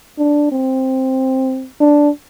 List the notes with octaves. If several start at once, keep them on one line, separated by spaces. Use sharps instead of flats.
D4
C4
D4